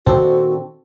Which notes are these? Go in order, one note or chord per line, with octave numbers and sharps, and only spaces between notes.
A#2 D#3 C4 D4 F#4 A4